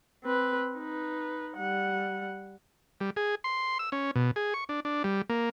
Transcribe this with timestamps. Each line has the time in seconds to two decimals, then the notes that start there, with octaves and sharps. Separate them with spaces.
0.24 C4 B4
0.77 D#4 B4
1.56 G3 F#5
3.01 G3
3.16 G#4
3.44 C6
3.79 E6
3.92 C#4
4.16 B2
4.36 G#4
4.54 C#6
4.69 D4
4.85 D4
5.04 G3
5.30 A#3